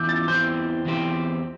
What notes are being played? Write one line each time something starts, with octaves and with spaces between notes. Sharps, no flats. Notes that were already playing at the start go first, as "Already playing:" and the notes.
Already playing: E2 E3 D6 E6 G6
A6
E2 E3 C4 G4 C5 G6
E2 E3 C4 G4 C5